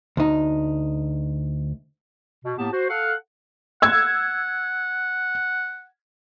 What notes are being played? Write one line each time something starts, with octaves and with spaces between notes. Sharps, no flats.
D2 D#4
B2
A2 A#3 B3 G4 A5
F#4 C5
A4 F5 F#5
F#5 E6 G#6